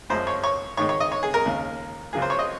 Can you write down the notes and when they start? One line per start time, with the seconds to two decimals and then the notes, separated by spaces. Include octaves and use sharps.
0.10 F#2 F3 G#3 C5
0.27 C#5
0.43 C#5
0.77 G#2 D#3 G#3 C#5
0.89 C#5
1.00 D#5
1.12 C#5
1.23 G#4
1.34 A#4
1.46 D#2 C#3 G#3
2.13 C#2 C#3 F#3 A#3 G#4
2.22 C5
2.30 C#5
2.39 D#5